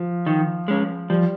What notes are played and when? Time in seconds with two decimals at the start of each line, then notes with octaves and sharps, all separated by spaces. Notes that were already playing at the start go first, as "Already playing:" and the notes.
Already playing: F3
0.26 D#3
0.68 G#3 C#4
1.10 F3 G3